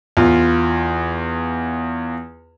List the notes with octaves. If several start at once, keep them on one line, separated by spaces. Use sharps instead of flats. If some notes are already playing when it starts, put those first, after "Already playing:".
E2 F4